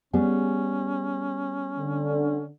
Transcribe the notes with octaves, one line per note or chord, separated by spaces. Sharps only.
G3 B3 C#4 G#4
D3